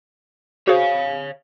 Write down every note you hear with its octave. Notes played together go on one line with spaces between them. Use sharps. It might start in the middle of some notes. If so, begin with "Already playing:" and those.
F#4 G#4 C5 C#5 F5